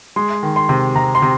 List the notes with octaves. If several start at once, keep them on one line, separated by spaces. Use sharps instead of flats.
G#3 C6
D#3
C6
C3
C3 A#5
C6
C3